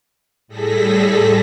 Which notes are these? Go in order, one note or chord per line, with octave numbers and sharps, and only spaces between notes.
A2 G3 G#4 A4 A#6 B6